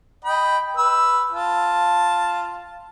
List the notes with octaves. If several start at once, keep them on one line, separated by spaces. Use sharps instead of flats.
D#5 G5 B5
B4 E6
F4 A5